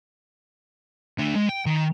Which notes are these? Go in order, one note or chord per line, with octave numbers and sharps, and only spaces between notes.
A3 D4
G#3 G#4
G5
D#3